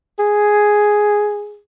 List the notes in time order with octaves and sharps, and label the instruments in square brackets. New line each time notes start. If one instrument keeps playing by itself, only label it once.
[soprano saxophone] G#4